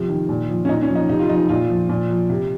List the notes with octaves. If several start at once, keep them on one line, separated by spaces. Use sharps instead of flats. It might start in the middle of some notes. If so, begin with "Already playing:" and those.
Already playing: C3 F3
D#3
A#2
F3
C#4
A#2 D#4
C#4
F3
D#4
C3 D#4
F4
F3 D#4
A#2 F4
F3
A#2
F3
C3